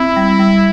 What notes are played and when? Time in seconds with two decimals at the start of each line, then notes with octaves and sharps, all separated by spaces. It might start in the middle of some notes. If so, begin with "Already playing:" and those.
Already playing: C4 E4
0.16 G3
0.40 G3